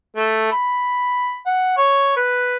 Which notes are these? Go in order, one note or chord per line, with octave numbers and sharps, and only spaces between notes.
A3
B5
F#5
C#5
B4